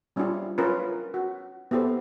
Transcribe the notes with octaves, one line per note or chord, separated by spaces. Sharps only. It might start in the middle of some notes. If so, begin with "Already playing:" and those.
G3 C#4 D4 E4 F4 G4
C#4 F4 A#4 B4
F#4
B3 E4 G4 A4 C5